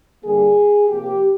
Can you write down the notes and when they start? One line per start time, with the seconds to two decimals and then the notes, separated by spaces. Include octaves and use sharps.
0.23 G2 D3 G3 A#3 G#4
0.88 C3 F3 A#3 G4